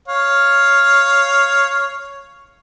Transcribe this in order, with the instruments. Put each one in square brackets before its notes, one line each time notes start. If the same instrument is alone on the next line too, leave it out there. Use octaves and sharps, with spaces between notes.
[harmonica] C#5 F5